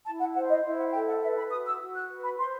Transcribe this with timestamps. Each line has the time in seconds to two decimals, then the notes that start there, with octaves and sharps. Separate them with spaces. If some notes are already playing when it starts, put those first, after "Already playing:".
0.05 E4 A5
0.20 F#5
0.34 C5 F#5
0.49 D#5
0.64 E4
0.78 F#5
0.92 A4 G5
1.08 F#5
1.22 B4 E5
1.37 B5
1.51 F#4 D#6
1.65 E6
1.80 F#4
1.95 F#6
2.10 B4
2.24 B5
2.38 C5 C6